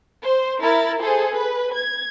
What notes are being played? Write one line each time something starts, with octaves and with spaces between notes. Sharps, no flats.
C5
E4 A#4 A6
G#4 A4 C5
B4
G#6